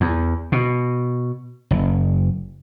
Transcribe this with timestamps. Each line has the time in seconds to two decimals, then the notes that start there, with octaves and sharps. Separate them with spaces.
0.01 E2
0.52 B2
1.71 F#1